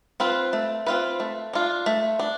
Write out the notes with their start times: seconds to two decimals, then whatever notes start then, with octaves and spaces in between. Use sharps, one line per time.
0.20 C4 F4 B4
0.53 A3
0.87 C4 F4 B4
1.20 A3
1.53 D4 F4
1.86 A3
2.19 D4